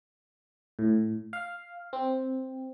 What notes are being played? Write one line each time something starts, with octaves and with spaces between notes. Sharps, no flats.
A2
F5
C4